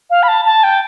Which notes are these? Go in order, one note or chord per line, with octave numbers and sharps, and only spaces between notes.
F5
B5
A5
A5
G5